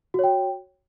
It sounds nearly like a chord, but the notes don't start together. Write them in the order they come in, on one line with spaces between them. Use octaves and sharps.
F#4 C#5 G5